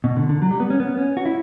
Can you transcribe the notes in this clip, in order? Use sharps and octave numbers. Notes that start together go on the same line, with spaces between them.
B2
D3
D3
F#3
G3
B3
C#4
B3
C#4
F#4
E4